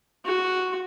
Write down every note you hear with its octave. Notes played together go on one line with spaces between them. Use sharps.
F#4